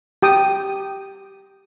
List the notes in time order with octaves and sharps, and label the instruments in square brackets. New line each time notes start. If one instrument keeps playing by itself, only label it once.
[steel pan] G4 G5 D#6